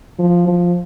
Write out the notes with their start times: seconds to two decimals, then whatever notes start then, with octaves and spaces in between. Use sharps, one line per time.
0.19 F3
0.47 F3